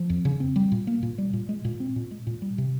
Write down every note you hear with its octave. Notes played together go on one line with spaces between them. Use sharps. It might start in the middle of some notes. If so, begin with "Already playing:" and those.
Already playing: F3
F2
C#3
C4
G3
A#2
A#3
A#2
G3
A#2
G#3
A#2
C4
A#2
G#3
A#2
G3
C3